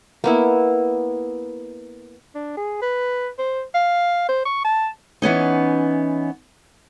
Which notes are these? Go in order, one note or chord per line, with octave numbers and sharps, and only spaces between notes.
A#3 B3 E4
D4
G#4
B4
C5
F5
C5
C#6
A5
E3 B3 C#4 D#4